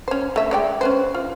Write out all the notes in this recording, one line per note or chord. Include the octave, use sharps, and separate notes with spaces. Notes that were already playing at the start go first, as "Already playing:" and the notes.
C#4 C5
A3 E5
G#3 D5 G5
C#4 B4 C5
F4